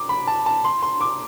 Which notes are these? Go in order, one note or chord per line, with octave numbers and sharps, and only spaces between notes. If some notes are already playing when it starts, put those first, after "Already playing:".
Already playing: D6
B5
A5
A5
C6
C6
D6